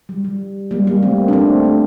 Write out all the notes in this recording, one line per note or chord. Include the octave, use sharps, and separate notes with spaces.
G3
G3
G3 A#3
G3 A#3
A3 C4
D4
A3 C4
A3